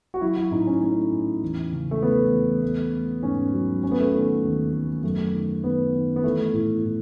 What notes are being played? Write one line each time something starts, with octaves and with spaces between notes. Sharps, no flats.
F#4
F#3 E4
E4
A2 D#4
C#4
A3 C#4
A2
E2
C#3
A3
E2 B3
E2
A3
A3
G#2 C#4
F#3
A3 C#4
B3
A3
B3
D#3
D#2
A3
F#2 A3
D#3
D#3 B3
D#3
B3
E3 A3
A2
A2